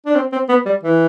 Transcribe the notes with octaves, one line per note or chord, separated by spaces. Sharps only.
D4
C4
C4
B3
G3
E3